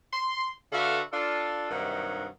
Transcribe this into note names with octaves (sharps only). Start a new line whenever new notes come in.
C6
D3 F#4 A4 B4 E5 F5
D4 F4 A4
G2 C3 D#3 F#3 D#4 F#5